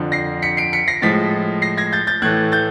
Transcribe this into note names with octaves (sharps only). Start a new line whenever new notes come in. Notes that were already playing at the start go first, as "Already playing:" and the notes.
Already playing: F2 D3 F3
A#6 C7
B6 C#7
C7 D7
B6 C#7
A#6 C7
A2 F3 G#3 A6 B6
A#6 C7
G#6 A#6
G6 A6
G6 A6
A2 E3 A3 F#6 G#6
G6 A6